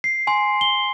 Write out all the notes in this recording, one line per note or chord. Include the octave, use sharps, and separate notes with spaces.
C7
G#5 C6
G7